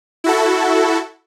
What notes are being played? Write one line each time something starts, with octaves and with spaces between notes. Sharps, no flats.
E4 F#4 A4